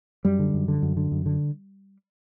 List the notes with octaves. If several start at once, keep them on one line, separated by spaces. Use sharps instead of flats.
F#2 G3
D3
F#2
D3
F#2
D3
F#2
D3